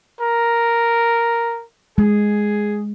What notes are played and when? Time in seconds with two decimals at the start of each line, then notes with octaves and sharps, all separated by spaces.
0.20 A#4
1.98 G#3 G#4